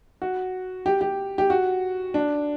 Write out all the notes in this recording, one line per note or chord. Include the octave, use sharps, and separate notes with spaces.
F#4
G4
G4
G4
F#4
D4